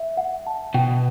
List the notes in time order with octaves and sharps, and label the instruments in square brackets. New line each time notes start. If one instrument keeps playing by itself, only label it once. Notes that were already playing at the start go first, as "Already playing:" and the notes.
Already playing: [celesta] E5
F#5
A5
[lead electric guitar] B2 [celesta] G5